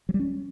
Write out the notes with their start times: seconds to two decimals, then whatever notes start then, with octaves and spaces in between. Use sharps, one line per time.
0.09 F#3
0.14 G3
0.19 C#4